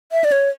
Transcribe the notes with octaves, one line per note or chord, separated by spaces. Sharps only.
E5
D5
C#5